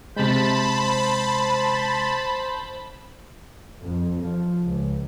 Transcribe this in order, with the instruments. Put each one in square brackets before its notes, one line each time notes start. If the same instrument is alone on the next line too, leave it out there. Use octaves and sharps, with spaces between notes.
[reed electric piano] C3 G#3 [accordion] C5 G6 [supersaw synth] A5 B5
[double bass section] F2
F3
C#2